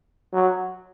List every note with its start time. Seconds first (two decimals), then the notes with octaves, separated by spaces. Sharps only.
0.33 F#3